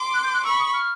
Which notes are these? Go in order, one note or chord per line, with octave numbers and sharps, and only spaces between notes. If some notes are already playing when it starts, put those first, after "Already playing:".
Already playing: C6 D6
F#6
G6
F#6
B5 C#6 E6
D#6
F6